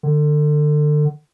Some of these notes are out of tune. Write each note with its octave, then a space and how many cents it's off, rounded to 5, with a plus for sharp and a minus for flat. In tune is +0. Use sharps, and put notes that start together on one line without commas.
D3 +30